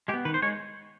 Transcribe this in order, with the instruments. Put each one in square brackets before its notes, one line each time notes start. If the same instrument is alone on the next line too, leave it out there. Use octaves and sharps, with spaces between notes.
[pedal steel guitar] G#3 G4
B3
D#3 B4
C5
G#3 C#5